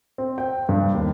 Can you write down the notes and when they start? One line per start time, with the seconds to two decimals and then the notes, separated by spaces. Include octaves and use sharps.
0.18 C4
0.38 G5
0.69 G2
0.95 D#2